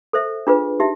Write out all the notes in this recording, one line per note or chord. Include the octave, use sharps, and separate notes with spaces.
A4 C5 E5
D4 F4 G#4 B4
D#4 G4 E5